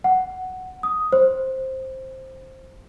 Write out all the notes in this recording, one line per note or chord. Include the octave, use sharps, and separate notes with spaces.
F#5
D#6
C5